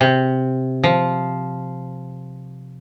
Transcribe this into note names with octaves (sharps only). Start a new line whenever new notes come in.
C3
F3